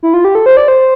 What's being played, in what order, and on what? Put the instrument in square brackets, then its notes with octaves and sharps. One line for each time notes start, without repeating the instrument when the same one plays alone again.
[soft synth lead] E4
F4
G4
A4
C5
D5
C5